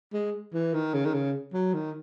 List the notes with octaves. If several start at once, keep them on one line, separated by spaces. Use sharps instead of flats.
G#3
E3
D#3
C#3
D#3
C#3
F#3
D#3